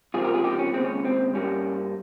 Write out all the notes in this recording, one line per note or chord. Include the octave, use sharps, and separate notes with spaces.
C#2 C3 F3 A#3 F4 G#4
G4 A#4
F4 G#4
D#4 G4
C#4
D#2 C#3 G#3 C4
C#4
C#4
C4
G2 G3 A#3 C#4